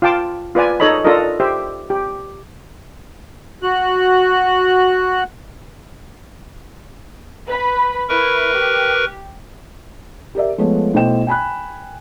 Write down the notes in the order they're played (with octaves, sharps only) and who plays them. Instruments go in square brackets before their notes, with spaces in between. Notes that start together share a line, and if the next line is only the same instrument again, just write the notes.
[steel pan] F4 F5 G5 A5 D6
F4 B4 D5 G#5
D#4 A4 C#5 D#5 B5
D4 F4 A4 A#4 D#5
G4 C5 E5
G4
[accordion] F#4 F#6
[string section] B4 B5
[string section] E4 [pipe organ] A#4 B4 C#6
[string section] G4
[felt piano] G4 A#4 D5 E5
F3 G#3 A3 B3 A4 C#5
B1 A3 E4 C5 G5 E7
G5 G#5 B5 F#6